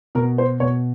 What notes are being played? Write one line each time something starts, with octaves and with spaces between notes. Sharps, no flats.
B2 A#4
C5
B2 C#5